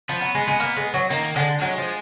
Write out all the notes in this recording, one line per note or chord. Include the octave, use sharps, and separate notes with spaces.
F3 B3
F#3
G#3
G#3
A#3
G#3
F#3
D#3 A#3
A#3
D3 G#3
F#3 G#3
F3